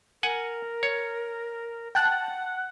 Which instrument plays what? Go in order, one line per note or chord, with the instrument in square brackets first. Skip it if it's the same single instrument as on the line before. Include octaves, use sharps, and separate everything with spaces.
[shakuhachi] A#4 [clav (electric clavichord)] F#5 G#5
[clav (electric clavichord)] C#5
[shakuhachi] F#5 [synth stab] G5 A5 F#6